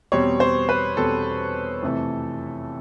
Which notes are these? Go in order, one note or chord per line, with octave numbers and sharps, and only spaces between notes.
E2 B2 G3 C4 C#5
C5
B4
E2 B2 G3 C4 A4
F2 C3 E3 A3